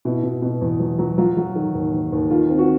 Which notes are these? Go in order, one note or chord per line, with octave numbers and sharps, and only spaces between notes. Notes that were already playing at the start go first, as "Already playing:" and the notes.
B2 E4
B2
B2
E2
F#3
F#3
F#3 F4
F#3
D#3
D#2
D#2
D#2
D#3 F4
C4
F#4